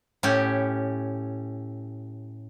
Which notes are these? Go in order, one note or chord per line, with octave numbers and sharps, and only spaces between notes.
A2 C#4 G4